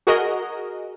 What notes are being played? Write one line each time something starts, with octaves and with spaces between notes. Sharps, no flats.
F#4 G#4 A#4 D#5